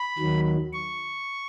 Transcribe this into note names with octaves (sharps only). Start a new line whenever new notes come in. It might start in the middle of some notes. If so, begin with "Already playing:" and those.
Already playing: B5
D#2 D#3 F#3
C#6